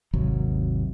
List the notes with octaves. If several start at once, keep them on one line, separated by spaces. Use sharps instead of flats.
G#1 D#2 C3 F#3